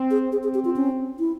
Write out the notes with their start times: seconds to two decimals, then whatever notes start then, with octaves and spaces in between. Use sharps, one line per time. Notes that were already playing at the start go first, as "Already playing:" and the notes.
Already playing: C4
0.11 G#4
0.32 C4 G#4
0.43 G#4
0.54 G4
0.65 F4
0.76 C#4
1.19 E4